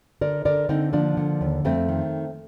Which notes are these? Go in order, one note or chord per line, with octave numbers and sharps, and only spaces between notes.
D3 A#4 D5
D3 A#4 D5
D3 C4 D#4
F3 A#3 D4
D3
D#2
F2 A3 C4
D#3